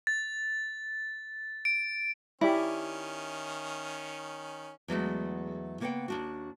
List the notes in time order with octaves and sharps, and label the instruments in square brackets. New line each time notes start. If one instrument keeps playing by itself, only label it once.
[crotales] A6
D7
[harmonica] D#3 C#4 [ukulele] E4 [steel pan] G4 D5 B5
[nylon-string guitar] E2 F#3 G#3 A3
C#3 A#3 B3 C5 F#5 G5
D#2 D4 F#4